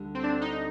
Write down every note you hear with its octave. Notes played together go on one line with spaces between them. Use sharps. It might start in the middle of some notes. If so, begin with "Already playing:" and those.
Already playing: D2 D3 G3
C4
D4
D#4